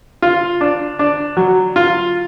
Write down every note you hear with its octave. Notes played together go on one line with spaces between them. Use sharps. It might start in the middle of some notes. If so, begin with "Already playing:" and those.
F4
D4
D4
F#3
F4